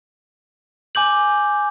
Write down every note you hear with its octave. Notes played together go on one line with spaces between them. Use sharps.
G#5 D6 G6 F#7